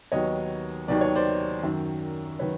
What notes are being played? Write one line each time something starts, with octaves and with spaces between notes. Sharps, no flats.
D#2 D#3 F#3 B3 C#5 D#5
D#2 D#3 F#3 B3 D5
C#5
C5 D5
F#2 D#3 F#3
D#3 F#3 B4 C#5